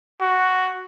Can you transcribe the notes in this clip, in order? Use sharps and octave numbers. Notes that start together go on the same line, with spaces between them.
F#4